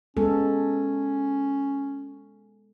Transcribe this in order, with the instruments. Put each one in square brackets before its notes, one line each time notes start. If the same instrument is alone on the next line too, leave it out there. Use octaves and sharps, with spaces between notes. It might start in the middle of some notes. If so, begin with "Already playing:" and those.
[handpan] G#3 B3 A4 [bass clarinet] C#4